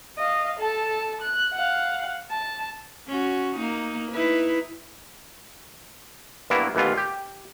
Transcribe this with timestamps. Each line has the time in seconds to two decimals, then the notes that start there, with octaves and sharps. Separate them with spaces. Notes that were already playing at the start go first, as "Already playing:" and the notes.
0.18 D#5 F5
0.59 A4 A5
1.22 F#6
1.54 F5 F#5
2.31 A5
3.07 C#4 F#4
3.56 A#3 D#4
4.11 D#4 E4 B4
6.50 G2 A#3 B3 E4
6.75 A1 D#2 E3 B3 F4
6.98 G4